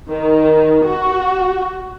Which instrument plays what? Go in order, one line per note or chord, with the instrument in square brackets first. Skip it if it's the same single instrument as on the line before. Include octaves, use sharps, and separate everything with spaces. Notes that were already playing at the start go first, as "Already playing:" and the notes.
[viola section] D#3
F#4